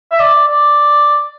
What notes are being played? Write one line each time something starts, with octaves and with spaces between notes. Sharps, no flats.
E5
D5
D5